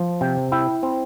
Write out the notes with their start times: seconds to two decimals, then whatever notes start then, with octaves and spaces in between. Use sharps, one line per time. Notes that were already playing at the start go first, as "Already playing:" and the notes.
Already playing: F3
0.21 C3 G5
0.52 E4 G5
0.83 C4